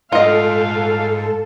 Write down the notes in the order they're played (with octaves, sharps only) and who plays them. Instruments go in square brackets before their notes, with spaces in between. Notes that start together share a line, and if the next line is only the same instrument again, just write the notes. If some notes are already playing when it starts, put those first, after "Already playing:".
[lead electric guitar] G#2 F#5 [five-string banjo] F4 D#5 [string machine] A4 [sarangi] F5